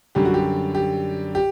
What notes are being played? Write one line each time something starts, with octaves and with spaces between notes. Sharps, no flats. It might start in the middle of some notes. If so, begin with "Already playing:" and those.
F#2 D3 G3 G4
F#4
G4
G4
G4